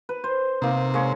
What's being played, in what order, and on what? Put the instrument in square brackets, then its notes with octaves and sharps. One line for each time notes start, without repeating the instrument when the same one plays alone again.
[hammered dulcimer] B4
C5
[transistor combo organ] C3 [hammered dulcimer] A#3 D#4
[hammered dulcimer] G#3 A#3 C#5